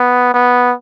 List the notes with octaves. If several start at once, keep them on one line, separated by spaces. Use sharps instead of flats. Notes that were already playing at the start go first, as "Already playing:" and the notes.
Already playing: B3
B3